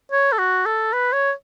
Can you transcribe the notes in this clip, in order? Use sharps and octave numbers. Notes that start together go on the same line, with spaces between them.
C#5
A4
F#4
A4
B4
C#5